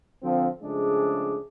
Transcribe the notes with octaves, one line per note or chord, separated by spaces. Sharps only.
D3 F3 C4
C#3 F3 G#3 A3 D4 G#4